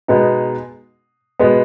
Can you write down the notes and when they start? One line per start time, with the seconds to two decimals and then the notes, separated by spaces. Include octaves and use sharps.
0.08 B2 G#3 B3 D#4
1.39 B2 G#3 B3